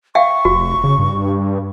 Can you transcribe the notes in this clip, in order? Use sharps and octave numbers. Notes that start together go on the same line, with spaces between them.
E5 F5 G5 C#6
F1 F#4
C#3
G2